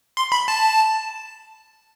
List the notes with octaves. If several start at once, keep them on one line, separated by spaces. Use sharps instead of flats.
C6
B5
A5